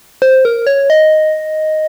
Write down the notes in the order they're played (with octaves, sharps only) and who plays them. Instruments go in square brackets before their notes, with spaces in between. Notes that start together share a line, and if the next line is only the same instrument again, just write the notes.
[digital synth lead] C5
A#4
C#5
D#5